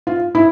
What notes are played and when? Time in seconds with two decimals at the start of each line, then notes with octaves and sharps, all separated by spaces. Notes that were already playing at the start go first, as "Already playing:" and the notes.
0.07 F4
0.35 E4